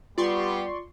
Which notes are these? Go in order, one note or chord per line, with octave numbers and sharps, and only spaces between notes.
G3 B3 F4 G4 D5 C6 C#6